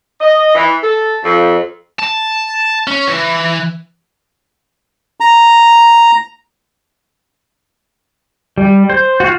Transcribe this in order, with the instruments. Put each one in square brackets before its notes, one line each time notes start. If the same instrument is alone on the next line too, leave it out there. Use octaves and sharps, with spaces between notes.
[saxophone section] D#5
E3
A4
F2
[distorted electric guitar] A5
C#4
E3
[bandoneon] A#5
[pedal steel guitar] G3
C5
F4 F#4